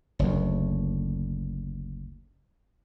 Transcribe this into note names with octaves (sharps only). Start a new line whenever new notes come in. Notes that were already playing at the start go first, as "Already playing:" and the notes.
F#1 D2